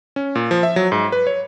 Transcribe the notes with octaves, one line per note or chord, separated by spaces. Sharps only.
C#4
A#2
F3
E5
F#3
G#2
B4
C#5